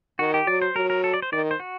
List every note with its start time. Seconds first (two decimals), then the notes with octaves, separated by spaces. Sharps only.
0.19 D#3 F#4
0.34 G4
0.47 F#3 D5
0.62 C5
0.76 F#3 A#4
0.90 A#4
1.04 A4
1.14 D5
1.22 C5
1.33 D#3 D5
1.51 C5
1.60 F#4